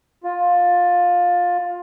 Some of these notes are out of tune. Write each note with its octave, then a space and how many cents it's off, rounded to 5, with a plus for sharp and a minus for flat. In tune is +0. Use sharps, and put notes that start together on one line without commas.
F4 +20